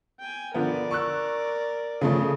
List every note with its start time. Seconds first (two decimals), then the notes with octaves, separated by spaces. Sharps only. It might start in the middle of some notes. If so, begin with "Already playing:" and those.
0.20 G5 G#5
0.54 D3 F3 B3 A#4 D5
0.91 C#6 E6 F#6
2.01 C#3 F3 A3